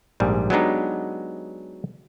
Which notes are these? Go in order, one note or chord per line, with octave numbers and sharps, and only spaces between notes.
A#1 G#2 G3
F#3 G#3 B3 D4 D#4 G4